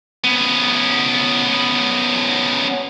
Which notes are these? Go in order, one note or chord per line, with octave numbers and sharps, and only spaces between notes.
B3 C#4